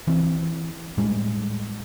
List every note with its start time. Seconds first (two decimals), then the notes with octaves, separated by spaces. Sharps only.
0.07 E3 C4
0.98 A2 G3 G#3